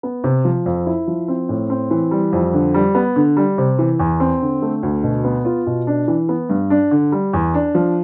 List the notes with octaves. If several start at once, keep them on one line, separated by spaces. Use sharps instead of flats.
B3
C3
F3
F2
E4
F3
C4
A2
C4
E3
G3
F2
D3
G3
B3
D3
G3
C3
E3
E2
C4
D3
A3
D2
B2
B3
F4
B2
D4
E3
B3
G2
D4
D3
G3
E2
D4
F3